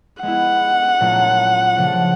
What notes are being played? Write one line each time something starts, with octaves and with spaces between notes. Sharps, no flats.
G#3 B3 E4 F#5
A#2 F#3 A3 C#4 F4
C#3 F3 A3 D4